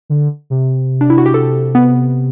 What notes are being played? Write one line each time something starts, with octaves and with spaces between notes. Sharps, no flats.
D3
C3
D4
E4
F#4
G4
A4
B3